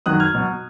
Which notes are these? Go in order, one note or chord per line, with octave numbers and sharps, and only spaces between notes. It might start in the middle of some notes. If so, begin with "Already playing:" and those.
F#2 D#3 F#3 D#6 F#6
F6 G#6
B2 F#3